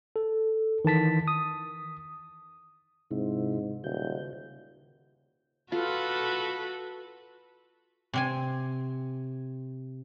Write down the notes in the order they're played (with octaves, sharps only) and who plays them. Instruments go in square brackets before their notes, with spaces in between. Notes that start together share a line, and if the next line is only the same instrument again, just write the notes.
[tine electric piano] A4
D#3 E3 A5 B6
D#6
[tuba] G#2 [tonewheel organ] C3 C4 E4
[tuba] D#1 [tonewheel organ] C#3 F#4 G6
[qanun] F4 [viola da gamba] F#4 A4 B4
[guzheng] C3 C4 G#5